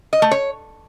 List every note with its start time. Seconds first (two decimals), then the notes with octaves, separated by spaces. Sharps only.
0.13 D#5
0.22 A3
0.31 C#5